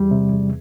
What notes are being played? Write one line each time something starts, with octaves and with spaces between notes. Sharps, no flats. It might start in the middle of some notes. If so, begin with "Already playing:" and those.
Already playing: E2 G3
C3
E2